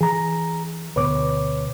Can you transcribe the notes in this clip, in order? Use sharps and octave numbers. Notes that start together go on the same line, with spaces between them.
E3 G#4 A#5
D2 B2 B4 C#5 D6